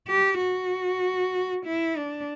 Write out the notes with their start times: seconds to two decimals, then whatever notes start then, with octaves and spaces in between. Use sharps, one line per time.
0.09 G4
0.41 F#4
1.66 E4
1.97 D4